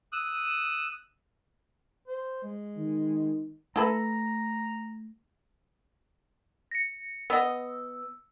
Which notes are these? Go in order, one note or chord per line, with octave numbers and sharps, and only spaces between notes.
D#6 E6 F#6
C5
G#3
D#3
A3 E4 A4 B4 A#5
A#6 C#7
B3 D#5 E6